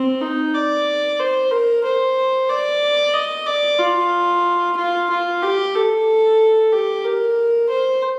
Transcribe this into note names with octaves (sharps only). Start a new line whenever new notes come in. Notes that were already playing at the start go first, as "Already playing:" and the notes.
Already playing: C4
D#4
D5
C5
A#4
C5
D5
D#5
D5
F4
F4
F4
G4
A4
G4
A#4
C5